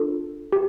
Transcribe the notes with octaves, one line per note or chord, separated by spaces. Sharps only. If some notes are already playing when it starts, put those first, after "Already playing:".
Already playing: D4 F4 A4
G4